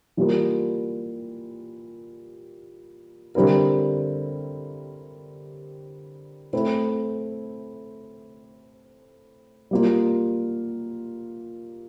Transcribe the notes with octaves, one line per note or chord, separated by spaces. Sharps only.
E3 G3 A#3 F4 A#4
D3 G3 C4 E4 A#4
A3 C4 E4
G3 A#3 F4